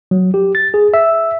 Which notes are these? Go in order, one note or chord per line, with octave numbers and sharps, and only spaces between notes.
F#3
G4
A6
G#4
E5